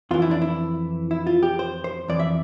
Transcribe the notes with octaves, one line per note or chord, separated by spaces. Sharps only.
F2 E3 F4
E4
D4
E4
E4
F4
G4
C5
C5
F2 E3 D5
E5